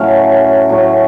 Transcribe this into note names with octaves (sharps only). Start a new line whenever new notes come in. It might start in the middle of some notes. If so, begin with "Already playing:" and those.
Already playing: A2 F#3 A3 C#4 F5
A2 F#3 A3 C#4